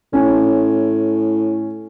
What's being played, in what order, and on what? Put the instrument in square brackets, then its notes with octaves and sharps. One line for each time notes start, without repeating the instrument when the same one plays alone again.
[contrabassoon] A2 [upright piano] C#4